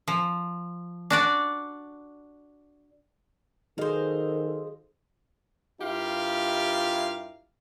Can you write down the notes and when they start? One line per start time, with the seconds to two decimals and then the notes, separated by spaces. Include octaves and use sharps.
0.08 F3
1.10 D4 F#4 D5
3.78 D#3 F#4 G#4 A4 C5 D#5 F5
5.82 G2 E4 F4 G4 A#4 F5